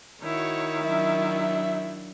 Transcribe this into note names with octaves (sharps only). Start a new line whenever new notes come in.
D#3 E4 F#4 C#5
F#3 D4 E5